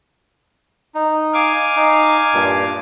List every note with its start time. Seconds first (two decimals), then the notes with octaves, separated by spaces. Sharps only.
0.95 D#4
1.34 F5 G#5 D6
1.76 D#4
2.34 G2 A#2